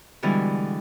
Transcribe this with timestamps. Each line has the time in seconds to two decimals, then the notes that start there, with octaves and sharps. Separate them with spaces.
0.22 B2 D3 E3 G3 G#3